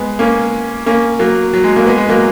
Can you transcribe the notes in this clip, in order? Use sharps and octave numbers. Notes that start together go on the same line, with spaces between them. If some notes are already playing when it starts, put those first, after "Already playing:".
Already playing: G#3 B3
A#3 C#4
A#3 C#4
F#3 A#3
F#3
G#3
F#3 A#3
G#3 B3
G#3
F#3 A#3